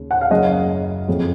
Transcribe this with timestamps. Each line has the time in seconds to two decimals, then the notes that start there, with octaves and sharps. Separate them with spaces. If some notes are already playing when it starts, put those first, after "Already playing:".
Already playing: D#2 C#3
0.11 F#5
0.21 F5
0.30 F#1 F#2 C#3 D#5
1.08 F2 C#3